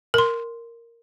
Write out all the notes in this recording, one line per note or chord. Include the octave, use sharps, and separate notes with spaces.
A#4 C6